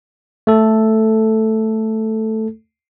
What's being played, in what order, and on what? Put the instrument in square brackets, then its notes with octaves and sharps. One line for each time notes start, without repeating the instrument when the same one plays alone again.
[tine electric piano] A3 A4